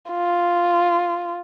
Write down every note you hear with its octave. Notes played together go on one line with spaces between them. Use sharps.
F4